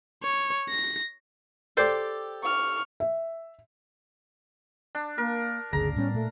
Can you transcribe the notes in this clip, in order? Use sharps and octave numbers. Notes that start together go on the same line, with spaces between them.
C#5
A#6
G4 A4 C5 D5
C#6 F6
E5
D4
A#3 A#4
G1 D2 C#3 G#4 A#5
A2 G3 B3 C#4
A#2 A3